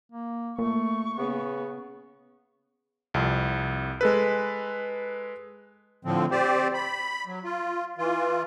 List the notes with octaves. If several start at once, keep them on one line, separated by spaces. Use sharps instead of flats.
A#3
A#2 A3 C#6
C#3 B3
C2 F2
G#3 A4 B4
A2 D3 F3 C4
C4 G4 C5 D5
B5
F#3
F4
E3 F4